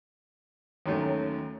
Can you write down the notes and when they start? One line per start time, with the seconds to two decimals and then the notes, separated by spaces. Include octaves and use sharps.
0.86 D#2 D#3 F#3 A3 C#4